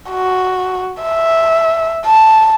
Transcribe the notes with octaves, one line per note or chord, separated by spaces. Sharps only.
F#4
E5
A5